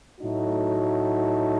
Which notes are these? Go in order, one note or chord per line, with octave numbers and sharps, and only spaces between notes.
A2 F#3 A3 D#4 F#4